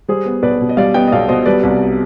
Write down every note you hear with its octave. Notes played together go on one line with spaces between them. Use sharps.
G3 G#4 C5
B3
B1 B4 D5
B2
D#5
G3 D5 F5
B3 D#5 G5
D#5
B1 D5 F5
B2 C5 D#5
G3 B4 D5
C2